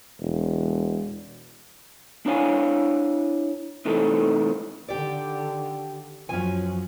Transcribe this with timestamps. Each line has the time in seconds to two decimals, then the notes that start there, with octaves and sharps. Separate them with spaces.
0.21 E1
2.26 D4 E4 C#5 F5 G#5
3.85 C3 E3 A3 D#4 A4
4.88 D3 D#3 G4 D5
6.29 F#2 F3 F#3 C#4 G#5